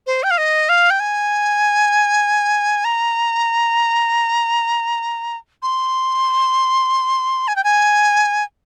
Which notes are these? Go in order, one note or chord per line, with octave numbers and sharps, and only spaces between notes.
C5
G5
F5
D#5
F5
G5
G#5
A#5
C6
G#5
G5
G#5